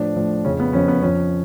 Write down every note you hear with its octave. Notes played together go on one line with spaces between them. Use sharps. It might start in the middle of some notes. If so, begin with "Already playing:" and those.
Already playing: A2 F3 D4
A2 F3
F2 C#3 F3 C#4
B3
F2 C#3 F3 C#4
B3
F2 F3 C#4